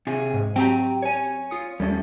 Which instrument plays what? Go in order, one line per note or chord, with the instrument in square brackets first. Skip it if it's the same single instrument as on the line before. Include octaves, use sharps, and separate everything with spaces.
[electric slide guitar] C3 G#4
[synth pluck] G#2
[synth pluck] F#3 C4 G4 [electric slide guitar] G5 A5 A#5
[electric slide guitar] C#5 G#5
[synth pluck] F4 D#6 C#7
[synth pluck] D#2 [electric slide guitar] G3 A3 C#4